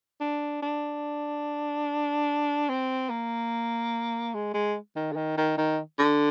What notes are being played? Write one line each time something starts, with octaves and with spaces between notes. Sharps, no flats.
D4
D4
C4
A#3
G#3
G#3
D#3
D3
D#3
D#3
D#3
D3